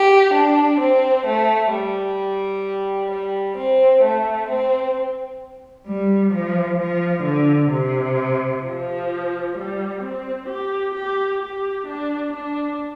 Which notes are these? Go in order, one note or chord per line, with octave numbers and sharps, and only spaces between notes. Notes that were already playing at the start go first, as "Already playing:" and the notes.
Already playing: G4
D4
C4
A3
G3
G3
C4
A3
C4
G3
F3
F3
D3
C3
F3
G3
C4
G4
G4
G4
D4
D4